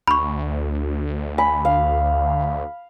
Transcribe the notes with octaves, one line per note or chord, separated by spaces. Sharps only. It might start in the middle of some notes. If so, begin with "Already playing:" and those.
D2 B5 C#6
G#5 B5
F5